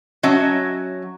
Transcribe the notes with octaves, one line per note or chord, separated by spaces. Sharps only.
F#3 C#4 D#5 E5 A5